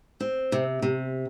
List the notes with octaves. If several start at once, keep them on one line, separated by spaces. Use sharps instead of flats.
C4
C3
C3